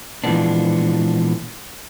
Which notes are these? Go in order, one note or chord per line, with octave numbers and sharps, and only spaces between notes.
A#2 E3 F3 G#3 B3 D4